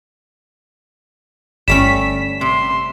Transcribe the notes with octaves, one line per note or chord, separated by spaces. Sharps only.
G1 G3 A3 C#4 B6 E7
C3 C6